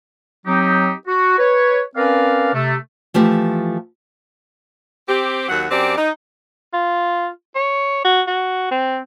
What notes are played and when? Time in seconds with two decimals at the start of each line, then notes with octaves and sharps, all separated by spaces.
0.47 F#3 C4 D#4 G4
1.08 F#4
1.39 B4 C#5
1.96 C4 C#4 A#4 B4 D5 F5
2.54 C3 A3
3.14 E3 F3 A3 G4
5.08 C4 G4
5.49 D#2 F#3 F#5
5.70 F#2 C4 G4 D5
5.97 D#4
6.73 F4
7.55 C#5
8.04 F#4
8.27 F#4
8.71 C4